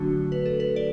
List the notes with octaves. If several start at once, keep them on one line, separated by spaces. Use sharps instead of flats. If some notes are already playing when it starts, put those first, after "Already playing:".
Already playing: D3 F#3 A3 D4 F#4
B4
A4
B4
D5